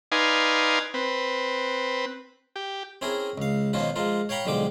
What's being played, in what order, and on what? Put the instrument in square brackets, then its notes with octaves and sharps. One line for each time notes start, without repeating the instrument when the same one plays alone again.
[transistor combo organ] D#4 B4 D5 F5 G#5 C6
C4 B4
G4
[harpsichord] C4 C#4 E4 G#4 A#4
C#2 F5
B2 D#3 F3 C#4 F4 F#4
F3 G#3 F4 A#4
C#5 F5 G5 A#5 B5 C#6
B1 D3 F3 G#3 G4 D6